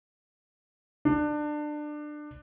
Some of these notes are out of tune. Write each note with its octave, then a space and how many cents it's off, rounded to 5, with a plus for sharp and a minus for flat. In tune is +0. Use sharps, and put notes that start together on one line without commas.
D4 +25